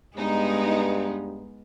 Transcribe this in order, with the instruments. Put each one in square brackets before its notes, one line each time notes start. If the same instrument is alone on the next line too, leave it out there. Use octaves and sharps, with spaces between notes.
[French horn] G2 [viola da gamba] G#3 B3 [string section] D#4